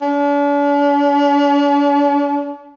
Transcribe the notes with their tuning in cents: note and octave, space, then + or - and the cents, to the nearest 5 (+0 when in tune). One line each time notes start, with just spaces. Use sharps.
D4 -45